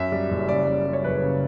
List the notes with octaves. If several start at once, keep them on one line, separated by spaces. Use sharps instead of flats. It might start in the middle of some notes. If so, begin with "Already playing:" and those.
Already playing: F#2 E5
G3
F#1
C#3 D5
F#2
G3
C#5
F#1 B4
C#3